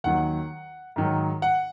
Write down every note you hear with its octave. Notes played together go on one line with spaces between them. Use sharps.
D#2 D#3 F#3 F#5
G#2 D#3 F#3
F#5